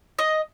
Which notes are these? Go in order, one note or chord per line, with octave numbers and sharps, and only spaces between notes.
D#5